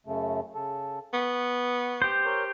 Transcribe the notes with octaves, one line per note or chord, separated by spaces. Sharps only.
F#2 C#3 A3
C#3 A4
B3 C#6
G4 C5
A#4 C#5